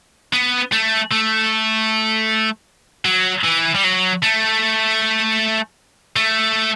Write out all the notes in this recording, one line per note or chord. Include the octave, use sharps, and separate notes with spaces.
B3
A3
A3
F#3
E3
G3
F#3
A3
A3